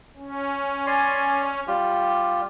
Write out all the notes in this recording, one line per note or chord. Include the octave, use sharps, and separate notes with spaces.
C#4
D5 G#5 C6
G3 F4 G4